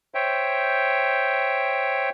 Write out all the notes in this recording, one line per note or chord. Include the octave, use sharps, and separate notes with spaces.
C5 C#5 E5 G5